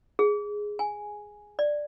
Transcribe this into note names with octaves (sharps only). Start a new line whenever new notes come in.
G#4
G#5
D5